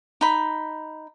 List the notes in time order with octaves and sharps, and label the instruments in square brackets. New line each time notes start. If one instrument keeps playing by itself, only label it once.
[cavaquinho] D#4 B5